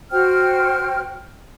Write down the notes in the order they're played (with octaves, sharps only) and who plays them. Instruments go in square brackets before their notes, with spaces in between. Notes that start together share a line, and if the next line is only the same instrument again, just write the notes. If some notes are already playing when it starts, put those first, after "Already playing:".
[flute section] F#4 C5 G5 F6